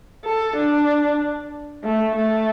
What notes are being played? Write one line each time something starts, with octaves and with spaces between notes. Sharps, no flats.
A4
D4
A3
A3